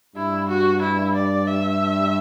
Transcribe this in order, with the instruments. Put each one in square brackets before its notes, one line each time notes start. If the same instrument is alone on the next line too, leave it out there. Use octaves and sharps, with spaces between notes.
[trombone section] G2 [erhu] E4
[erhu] F#4
E4
D5
E5